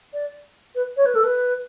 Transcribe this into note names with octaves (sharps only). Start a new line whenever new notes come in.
D5
B4
C#5
B4
A4
B4